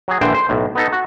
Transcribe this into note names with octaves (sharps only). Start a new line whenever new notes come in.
F#3 G#4
A#1 D3 E3 C5 G5
C5
B1 A2
B3 D#4 A4
F#4